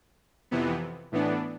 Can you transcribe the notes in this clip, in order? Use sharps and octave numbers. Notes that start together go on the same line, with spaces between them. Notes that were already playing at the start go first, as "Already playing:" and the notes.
F2 C3 E3 B3
A2 E3 B3 D4